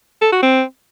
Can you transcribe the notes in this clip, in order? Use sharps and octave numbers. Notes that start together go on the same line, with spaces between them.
A4
F#4
C4